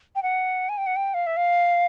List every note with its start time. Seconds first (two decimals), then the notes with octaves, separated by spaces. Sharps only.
0.15 G5
0.23 F#5
0.69 G#5
0.78 G5
0.87 F#5
0.96 G5
1.14 F5
1.27 E5
1.37 F5